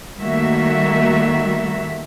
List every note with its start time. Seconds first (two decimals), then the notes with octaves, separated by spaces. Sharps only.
0.20 D#3 G3 A3 A#3 F#4 E5